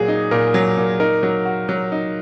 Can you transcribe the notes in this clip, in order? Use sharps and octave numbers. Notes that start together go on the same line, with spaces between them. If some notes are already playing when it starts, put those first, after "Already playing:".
Already playing: A#2 F#3 G#4
D#4
A#2 A#4
F#3
A#2
D#4 A#4
F#3
F#4
F#3
D#4